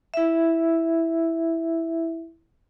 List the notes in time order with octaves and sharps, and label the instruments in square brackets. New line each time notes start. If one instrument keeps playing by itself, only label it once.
[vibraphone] E4 E5